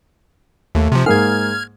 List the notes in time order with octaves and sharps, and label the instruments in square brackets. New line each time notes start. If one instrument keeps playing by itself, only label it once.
[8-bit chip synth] D#2 [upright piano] A3
[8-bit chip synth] C3 F3 [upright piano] C6
[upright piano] G#2 A#3 G#4 [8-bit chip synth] F6 G#6